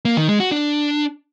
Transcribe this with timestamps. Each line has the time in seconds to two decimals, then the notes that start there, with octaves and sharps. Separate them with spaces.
0.05 A#3
0.17 D#3
0.28 G#3
0.40 F#4
0.51 D4